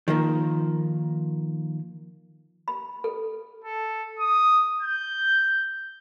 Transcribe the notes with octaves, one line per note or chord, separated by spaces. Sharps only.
D#3 F3 A#3
B5
A4
A4
D#6
G6